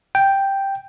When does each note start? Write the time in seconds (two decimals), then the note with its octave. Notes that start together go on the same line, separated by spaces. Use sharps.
0.15 G5